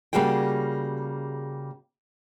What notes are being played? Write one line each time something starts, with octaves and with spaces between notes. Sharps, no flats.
C#3 G3 A#3 F#4 G#4 G5